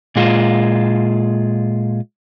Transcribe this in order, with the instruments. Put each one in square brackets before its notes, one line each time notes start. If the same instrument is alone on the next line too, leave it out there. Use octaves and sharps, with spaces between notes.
[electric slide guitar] A#2 G#3 F4